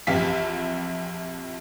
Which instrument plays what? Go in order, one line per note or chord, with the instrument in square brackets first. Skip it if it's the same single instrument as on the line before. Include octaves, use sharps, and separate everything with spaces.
[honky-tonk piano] A#1 F2 E3 G4 F5 B6